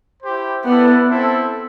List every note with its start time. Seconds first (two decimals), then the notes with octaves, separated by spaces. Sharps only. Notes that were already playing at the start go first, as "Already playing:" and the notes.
0.22 E4 G4 C5
0.64 B3 E4 A4 D5 F#5
1.08 C4 E4 A4 C5